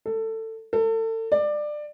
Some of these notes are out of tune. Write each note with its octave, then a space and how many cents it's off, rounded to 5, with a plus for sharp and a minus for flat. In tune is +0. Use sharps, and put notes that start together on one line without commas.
A4 +20
A4 +35
D5 +20